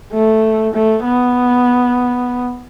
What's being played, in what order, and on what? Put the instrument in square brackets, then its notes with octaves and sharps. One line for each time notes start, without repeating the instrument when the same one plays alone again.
[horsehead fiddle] A3
A3
B3